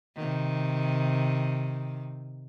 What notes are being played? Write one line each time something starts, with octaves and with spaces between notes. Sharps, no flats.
C3 D#3